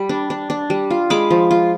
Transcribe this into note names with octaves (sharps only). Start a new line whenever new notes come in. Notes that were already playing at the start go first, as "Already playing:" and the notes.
Already playing: G3 B5
D4
D4
D4
G3
F4
G#3 B5 D6
F3
F4